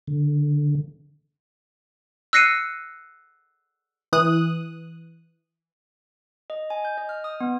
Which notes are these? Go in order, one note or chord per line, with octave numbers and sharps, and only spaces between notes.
D3
E6 F#6 A#6 C7 C#7 D#7
E3 D#6 F#6
D#5
G#5
G6
D#5
F6
D#6
B3